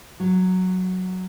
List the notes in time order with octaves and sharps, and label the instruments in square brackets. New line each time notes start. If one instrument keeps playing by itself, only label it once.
[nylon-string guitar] F#3